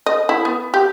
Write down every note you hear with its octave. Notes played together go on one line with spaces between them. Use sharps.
D#5
E4
B3
G4